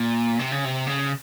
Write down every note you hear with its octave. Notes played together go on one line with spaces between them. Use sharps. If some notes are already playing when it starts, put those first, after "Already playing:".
Already playing: A#2
C3
C#3
C3
C#3